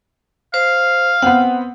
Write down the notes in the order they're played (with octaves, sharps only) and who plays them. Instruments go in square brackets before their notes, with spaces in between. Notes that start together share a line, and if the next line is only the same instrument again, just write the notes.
[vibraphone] C5 [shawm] F5
[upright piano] B3 C4 [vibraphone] F#5